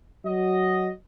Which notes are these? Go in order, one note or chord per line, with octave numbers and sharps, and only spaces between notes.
F#3 F#4 D#5